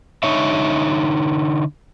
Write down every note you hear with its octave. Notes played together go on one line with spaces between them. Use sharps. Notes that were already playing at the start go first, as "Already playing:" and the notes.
D3 D#4 C#5 E5